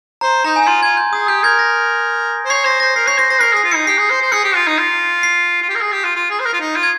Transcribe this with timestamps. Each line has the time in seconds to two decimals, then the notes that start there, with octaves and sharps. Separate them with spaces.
0.21 C5 A#5
0.44 D#4 A#5
0.56 G#5
0.61 D#4
0.67 F4 C6
0.83 F4 G#6
0.97 G6
1.13 G#4 D#6
1.28 G4 G6
1.43 A#4 G#6
1.59 A#6
2.45 C5
2.50 C#5 C7
2.65 C5 A#6
2.80 C5 A#6
2.96 A#4 C7
3.07 C#5 C7
3.18 C5 A#6
3.30 C5 A#6
3.41 A#4 C7
3.53 G#4 C7
3.64 F4
3.71 C#7
3.75 D#4
3.87 G4 C7
3.98 G#4
4.10 C5
4.21 C5
4.32 G#4 C#7
4.44 G4
4.55 F4
4.67 D#4
4.78 F4
5.23 C7
5.62 F4
5.69 G4
5.75 A#4
5.81 G#4
5.92 G4
6.04 F4
6.16 F4
6.30 G#4
6.40 C5
6.45 A#4
6.53 F4
6.60 D#4
6.76 F4
6.83 G#6